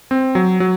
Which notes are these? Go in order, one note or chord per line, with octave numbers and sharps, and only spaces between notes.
C4
F#3
F#3